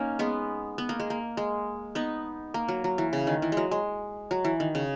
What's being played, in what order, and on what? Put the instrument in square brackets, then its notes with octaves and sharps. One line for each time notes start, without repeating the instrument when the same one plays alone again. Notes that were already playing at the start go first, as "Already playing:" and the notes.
Already playing: [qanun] A#3 C#4 D#4
G#3 B3
B3
A#3
G#3
A#3
G#3
B3 D#4
A#3
F#3
F#3
E3
C#3
D#3
E3
F#3 G#3
G#3
F#3
E3
D#3
C#3